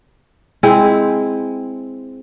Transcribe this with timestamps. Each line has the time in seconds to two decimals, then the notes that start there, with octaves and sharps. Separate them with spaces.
0.63 G#3 C4 E4